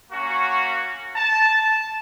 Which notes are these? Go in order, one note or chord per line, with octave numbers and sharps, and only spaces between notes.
A#3 C#4 F#4
A5